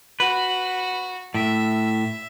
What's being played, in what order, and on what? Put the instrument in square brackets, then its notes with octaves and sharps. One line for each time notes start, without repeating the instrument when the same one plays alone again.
[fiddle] F#4 [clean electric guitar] B4
[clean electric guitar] A2 [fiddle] E5